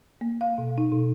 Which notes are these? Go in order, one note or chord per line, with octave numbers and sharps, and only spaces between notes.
A#3
F5
B2
D#4
B2